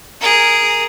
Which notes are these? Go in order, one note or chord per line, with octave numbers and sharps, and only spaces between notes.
G#4 A#4